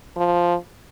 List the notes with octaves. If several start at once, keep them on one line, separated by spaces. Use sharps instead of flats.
F3